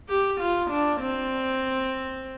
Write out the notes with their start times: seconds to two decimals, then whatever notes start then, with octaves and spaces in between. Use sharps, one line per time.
0.09 G4
0.40 F4
0.70 D4
1.01 C4